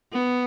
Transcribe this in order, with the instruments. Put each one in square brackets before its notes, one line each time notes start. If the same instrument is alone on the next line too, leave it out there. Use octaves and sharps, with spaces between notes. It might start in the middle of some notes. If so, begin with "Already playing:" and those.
[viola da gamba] B3